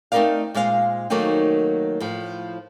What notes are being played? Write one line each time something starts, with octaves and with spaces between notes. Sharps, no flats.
A3 C4 D#4 A#4 D5 F5
A#2 G#3 C5 F5
D#3 F#3 A3 A#3 C4 D#4
A2 F3